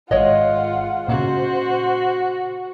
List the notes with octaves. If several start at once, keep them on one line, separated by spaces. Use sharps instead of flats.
G#1 G#3 F4 C#5 D#5 F#5
A#2 C#3 F#4 C5